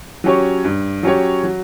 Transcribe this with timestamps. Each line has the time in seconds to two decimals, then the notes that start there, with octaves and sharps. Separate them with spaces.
0.24 F#3 C#4 G4 C#5
0.65 G2
1.03 F#3 C#4 G4 C#5
1.44 F#3